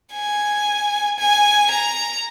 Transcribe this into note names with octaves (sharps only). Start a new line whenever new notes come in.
G#5
G#5
A#5